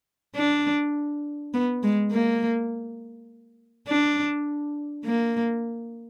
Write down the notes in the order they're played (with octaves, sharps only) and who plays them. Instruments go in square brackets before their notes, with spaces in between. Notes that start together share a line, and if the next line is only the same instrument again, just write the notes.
[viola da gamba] D4
B3
G#3
A#3
D4
A#3